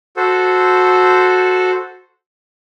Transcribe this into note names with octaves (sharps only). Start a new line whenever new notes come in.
F#4 A4 C5